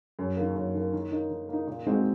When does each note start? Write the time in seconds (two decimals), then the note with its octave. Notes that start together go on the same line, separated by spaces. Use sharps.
0.19 F#2
0.37 D#3 A#3
0.56 F#2
0.75 D#3 A#3
0.93 D#3
1.11 A#3 D#4
1.30 D#3
1.49 A#3 D#4
1.67 A#2
1.86 G#3 C4 D#4 F#4